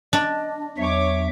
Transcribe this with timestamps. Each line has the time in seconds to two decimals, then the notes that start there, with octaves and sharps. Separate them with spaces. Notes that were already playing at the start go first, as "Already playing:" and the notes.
0.13 D4 D#5
0.78 E2 F#3 C#5 E5 D6